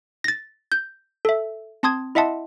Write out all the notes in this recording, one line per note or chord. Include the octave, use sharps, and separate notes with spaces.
A6 A#6
G6
A4 E5
C4 A5 C6 D#6 G#6
E4 D#5 E5 F#5 A5 C6